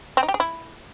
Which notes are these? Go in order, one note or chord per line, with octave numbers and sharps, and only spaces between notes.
C4
D#4
G4
G#4
E4